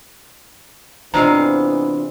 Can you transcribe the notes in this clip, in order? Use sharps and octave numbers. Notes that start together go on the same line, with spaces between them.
E2 C3 D4 F4 D#5 F5 A#5